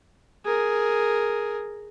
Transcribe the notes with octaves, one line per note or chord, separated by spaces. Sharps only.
G#4 A#4